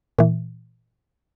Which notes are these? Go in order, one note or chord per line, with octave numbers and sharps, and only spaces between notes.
A#2 E3